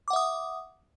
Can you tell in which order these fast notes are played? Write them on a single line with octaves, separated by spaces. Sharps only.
D6 F#5 E5 D#6